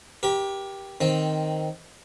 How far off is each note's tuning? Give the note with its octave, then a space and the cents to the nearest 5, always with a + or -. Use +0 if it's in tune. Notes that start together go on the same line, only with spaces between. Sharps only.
G4 +0 A#4 +40
D#3 +0 C4 +0